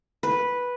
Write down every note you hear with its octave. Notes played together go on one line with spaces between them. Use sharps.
B4